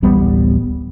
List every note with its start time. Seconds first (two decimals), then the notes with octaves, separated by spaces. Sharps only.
0.02 D1 A1 G3 B3